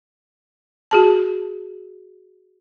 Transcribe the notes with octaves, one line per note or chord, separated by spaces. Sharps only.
F#4 G#4 A5